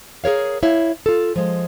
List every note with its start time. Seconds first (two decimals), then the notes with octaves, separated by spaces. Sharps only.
0.24 G#4 A#4 C#5 F5
0.63 E4 C#5 F5
1.06 F4 A4
1.36 F3 G#3